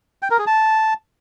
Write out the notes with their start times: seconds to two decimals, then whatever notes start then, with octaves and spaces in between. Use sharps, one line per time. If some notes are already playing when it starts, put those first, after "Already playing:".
0.22 G5
0.31 A#4
0.39 G#4
0.47 A5